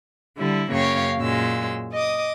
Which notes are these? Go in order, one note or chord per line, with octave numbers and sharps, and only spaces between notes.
D3 G3 E4
F#2 C#3 A#3 C#5 F5 G5
F#2 A#2 G#3 E6
D#5 D6 D#6